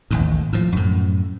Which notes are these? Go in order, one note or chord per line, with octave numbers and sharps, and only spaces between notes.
A1 D#2 G#2
A2 F3
F#2 A2